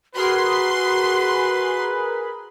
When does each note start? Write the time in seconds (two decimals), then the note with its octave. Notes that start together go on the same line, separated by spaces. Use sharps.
0.15 F#4 G#4 A#4 B4 B5 C6